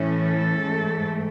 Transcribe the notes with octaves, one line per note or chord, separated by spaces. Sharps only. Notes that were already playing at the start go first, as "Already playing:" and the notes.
Already playing: A2 E3 A3 C#4
A4
G#2 E3 A3